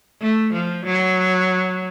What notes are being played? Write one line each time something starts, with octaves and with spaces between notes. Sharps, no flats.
A3
F3
F#3